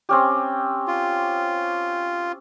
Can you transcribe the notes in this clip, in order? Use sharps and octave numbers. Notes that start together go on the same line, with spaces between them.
C4 C#4 G4
F4